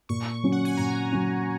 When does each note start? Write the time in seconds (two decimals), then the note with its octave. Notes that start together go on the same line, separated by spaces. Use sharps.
0.09 A#2 C#6
0.43 F#3 C#4
0.52 F#5
0.65 G#5
0.77 A#2 A#5
1.12 F#3 C#4